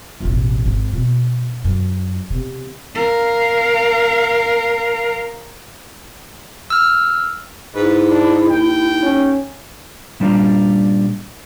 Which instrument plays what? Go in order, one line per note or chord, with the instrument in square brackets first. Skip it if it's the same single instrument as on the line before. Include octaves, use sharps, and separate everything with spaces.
[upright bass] E1 A1
G#1
B2
F#2
C3 B3
[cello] A#4 F5
[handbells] E6 F6
[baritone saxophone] G#2 [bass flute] E4 [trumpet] B4
[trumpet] D4
[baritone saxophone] D#2 [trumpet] G5
[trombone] C#4
[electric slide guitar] A#2 G3 D4 B4 F5 A#5